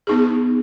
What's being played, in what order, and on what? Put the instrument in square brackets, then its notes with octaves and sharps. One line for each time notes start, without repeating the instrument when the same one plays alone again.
[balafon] B3 D#4 G#4